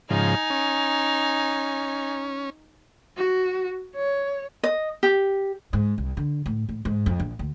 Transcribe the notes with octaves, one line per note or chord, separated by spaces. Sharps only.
G#2 C#3 F3 D#4 G#5
C#4
F#4
C#5
D#5
G4
G#2
C2
D3
A2
A2
G#2
F2
A#1
D2